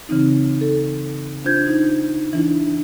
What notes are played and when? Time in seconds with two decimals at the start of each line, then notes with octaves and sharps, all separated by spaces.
0.09 C#3 E3 C4 D#4
0.61 A4
1.45 D4 F4 C5 G6 G#6
1.67 D#4
2.33 E3 D4 E4